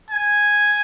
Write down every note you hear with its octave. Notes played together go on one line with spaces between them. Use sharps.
G#5